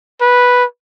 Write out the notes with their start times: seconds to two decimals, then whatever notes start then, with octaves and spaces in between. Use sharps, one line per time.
0.21 B4